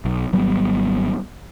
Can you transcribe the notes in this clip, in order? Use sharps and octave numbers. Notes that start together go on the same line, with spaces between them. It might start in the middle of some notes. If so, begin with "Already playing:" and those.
B1
G#1 F#3 G3 B3